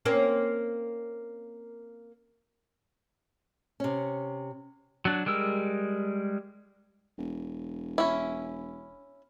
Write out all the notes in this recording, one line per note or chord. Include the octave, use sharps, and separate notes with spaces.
A#3 C4 C#4
C3 C#4
F#3 D4
G3 G#3 A#4 E6
E1
C#4 E4